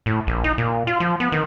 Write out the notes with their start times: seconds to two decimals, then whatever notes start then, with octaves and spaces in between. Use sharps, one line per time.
0.06 A2
0.27 A#1
0.44 D#4
0.58 A#2
0.87 F4
1.00 F3
1.20 B3
1.32 D#3